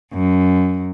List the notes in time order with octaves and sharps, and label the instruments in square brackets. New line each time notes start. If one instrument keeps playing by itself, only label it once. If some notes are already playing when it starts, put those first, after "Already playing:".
[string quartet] F#2